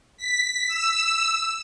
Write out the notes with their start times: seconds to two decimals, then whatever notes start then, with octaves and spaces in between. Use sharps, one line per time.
0.17 B6
0.68 E6